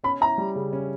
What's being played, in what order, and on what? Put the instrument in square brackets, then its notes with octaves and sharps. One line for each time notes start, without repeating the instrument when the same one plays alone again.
[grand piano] C#4 [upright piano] B5
[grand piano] E4 [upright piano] A#5
[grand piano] G3
C#3
C#4